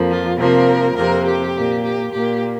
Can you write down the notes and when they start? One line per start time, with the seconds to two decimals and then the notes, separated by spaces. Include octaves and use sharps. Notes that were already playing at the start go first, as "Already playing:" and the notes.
Already playing: F2 F3 A#3
0.09 F4
0.38 C3 F3 A#3 A#4
0.96 F2 C3 A#3 A#4
1.26 G4
1.55 A#2 A#3
1.83 G4
2.12 A#2 A#3 G4